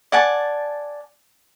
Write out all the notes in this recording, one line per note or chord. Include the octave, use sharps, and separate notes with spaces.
D5 F#5 G#5 A5